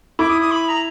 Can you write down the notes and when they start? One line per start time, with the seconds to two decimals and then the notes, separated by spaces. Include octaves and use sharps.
0.19 E4 D6
0.30 D#6
0.41 D#6
0.51 B5
0.69 A#5